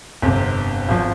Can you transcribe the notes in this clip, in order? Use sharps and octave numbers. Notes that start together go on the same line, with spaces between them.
G1 F2 C3
G#1 F3